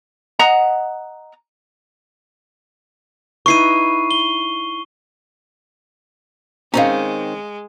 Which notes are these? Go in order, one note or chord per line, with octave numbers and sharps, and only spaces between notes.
D#5 F#5 A#5
D#4 E4 B4 C#6 C7 D#7
G7
D#3 G#3 C4 C#4 F5 A#5